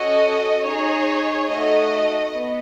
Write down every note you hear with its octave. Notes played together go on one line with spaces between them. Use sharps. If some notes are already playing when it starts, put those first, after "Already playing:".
Already playing: C#4 F#4 A4 D#5
D#4 G#4 C#5
A3 D#4 F#4 A4 D#5
B3